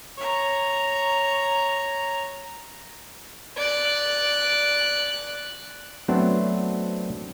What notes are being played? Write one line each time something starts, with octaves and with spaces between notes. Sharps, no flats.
C#5 A#5
D5 F#6
F#3 A3 B3 C4 D4 C5